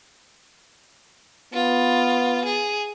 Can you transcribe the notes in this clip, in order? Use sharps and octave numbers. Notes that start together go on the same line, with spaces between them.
B3 F4
G#4